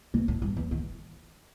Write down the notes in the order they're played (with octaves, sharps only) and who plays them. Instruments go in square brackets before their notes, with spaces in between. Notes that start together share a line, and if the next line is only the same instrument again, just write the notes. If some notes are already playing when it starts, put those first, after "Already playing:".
[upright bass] B2
A2
G2
E2
D#3